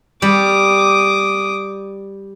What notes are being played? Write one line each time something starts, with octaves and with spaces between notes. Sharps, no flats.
G3 D6 D#6